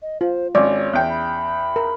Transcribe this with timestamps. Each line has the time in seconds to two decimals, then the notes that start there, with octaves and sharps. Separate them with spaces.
0.02 D#5
0.21 F4 C5
0.55 G#1 C#4 C#5 D5
0.93 E2 G5
1.10 B5
1.76 A#4